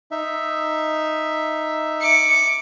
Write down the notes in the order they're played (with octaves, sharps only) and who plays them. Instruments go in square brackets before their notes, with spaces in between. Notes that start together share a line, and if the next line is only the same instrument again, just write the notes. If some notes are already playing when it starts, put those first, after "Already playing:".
[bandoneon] D#4 E5
[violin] D6 C#7